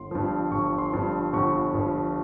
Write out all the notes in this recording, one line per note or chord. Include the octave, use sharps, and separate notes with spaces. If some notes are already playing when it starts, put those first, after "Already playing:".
Already playing: G1 C6
G2 F3
G1 C#6
C6
G2 F3
G1 C#6
G2 F3